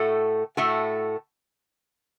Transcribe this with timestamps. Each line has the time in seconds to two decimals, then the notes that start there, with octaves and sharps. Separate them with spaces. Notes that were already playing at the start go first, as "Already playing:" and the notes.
Already playing: A2 A3 F#4 A4
0.57 A2 A3 F#4 A4